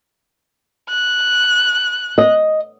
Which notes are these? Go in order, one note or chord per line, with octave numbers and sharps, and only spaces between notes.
F#6
D#5